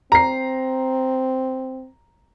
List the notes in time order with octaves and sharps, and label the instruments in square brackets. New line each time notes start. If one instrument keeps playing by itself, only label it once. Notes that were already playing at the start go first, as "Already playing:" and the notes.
[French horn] C4 [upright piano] A#5 C7